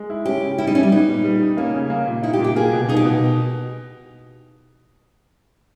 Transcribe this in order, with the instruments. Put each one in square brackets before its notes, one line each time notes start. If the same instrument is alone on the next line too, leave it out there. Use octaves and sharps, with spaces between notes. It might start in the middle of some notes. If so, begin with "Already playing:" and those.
Already playing: [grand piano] G#3
E4
[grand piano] C#4 [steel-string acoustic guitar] G4
[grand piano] C#3
[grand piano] G3 [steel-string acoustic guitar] E4
[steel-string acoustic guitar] D#4
[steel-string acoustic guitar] C#4 [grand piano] E4
[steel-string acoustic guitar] G3
[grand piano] B3 [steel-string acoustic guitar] D#4
[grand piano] A#2
G3
D#4
[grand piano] A#3 [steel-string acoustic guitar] C#4
[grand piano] C#3
A#3
A#2
[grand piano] D#4 [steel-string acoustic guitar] E4
[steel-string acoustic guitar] G4
[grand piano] A#2
[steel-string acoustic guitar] G4
[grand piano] A#3 [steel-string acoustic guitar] G#4
[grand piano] B2
[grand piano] D#4 [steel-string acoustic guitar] G#4
[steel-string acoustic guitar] G4
[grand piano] B2